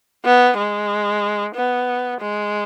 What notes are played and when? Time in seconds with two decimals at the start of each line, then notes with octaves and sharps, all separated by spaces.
0.25 B3
0.58 G#3
1.55 B3
2.20 G#3